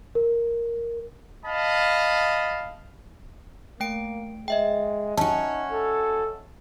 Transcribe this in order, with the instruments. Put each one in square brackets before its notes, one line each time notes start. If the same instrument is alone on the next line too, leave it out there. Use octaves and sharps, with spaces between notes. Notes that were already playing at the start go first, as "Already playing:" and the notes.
[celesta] A#4
[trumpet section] D#5 F5 A5 B5
[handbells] A3 G5 D7 [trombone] A#3
[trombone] G#3 [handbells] D#5 E5 G5
[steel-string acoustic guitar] C#4 F#4 [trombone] D#4 [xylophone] A5
[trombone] A4